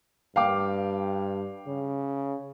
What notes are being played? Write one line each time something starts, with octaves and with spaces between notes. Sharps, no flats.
G2 F5 G5 D6
C#3